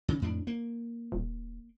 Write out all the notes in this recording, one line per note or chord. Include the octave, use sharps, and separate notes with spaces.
C#3
F2 A2 D4
A#3
D#1